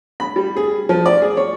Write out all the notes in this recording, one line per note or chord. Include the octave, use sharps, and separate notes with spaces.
B5
G3
G#4
F3
D5
G#4
C#5